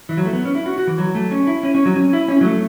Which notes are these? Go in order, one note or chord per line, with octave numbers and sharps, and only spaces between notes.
E3
F#3
A3
B3
C#4
E4
F#4
F#4
E3
F#3
A3
C#4
E4
C#4
C#4
F#3
C#4
E4
C#4
F#3
A3